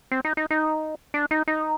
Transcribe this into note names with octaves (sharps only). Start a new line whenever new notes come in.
C4
D#4
D#4
D#4
D4
D#4
D#4